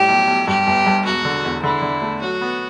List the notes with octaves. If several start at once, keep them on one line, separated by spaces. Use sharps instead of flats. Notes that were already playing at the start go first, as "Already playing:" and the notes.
Already playing: A2 G3 G4
B1
B1
G2 G4
G1
G2
E1 F#4
D3
E2
D3 E4
D3
A3
F#3 F#4
B3